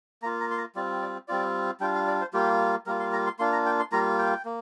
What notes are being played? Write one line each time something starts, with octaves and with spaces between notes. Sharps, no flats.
A#3 F4 A#5
A#5
C6
A#5
G3 C4 F4 D5
D5
G3 C4 F4 D5
G3 D4 F4 G5
F5
D5
C5
G3 A#3 F4 G4
G3 A#3 F4 A#4
C6
A#5
C6
A#3 D4 F4 C6
A#5
G5
C6
G3 A#3 F4 A#5
G5
A#3